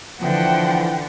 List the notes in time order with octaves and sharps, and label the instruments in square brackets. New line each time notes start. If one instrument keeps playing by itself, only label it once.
[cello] D3 [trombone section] E3 [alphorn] F3 [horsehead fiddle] F#5 G5